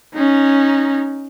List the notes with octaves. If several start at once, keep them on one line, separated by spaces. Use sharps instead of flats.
C#4 D#4